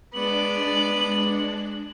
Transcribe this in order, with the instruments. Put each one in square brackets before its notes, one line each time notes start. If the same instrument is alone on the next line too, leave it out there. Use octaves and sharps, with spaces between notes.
[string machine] G#3 D4 [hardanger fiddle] B3 D5 [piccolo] F#7